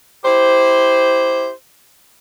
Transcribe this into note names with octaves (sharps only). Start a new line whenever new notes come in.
E4 G4 C5